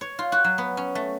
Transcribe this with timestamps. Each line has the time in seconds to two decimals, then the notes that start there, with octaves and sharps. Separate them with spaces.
0.01 C#5
0.19 F4
0.32 F#4
0.44 F#3
0.58 B3
0.77 C#4
0.95 A3